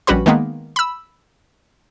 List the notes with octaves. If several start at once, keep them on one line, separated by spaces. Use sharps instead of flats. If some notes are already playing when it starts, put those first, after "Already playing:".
A#1 G3 C#4 F#4 B4 B5
D#3 G#3 A#3 B3
B5 E6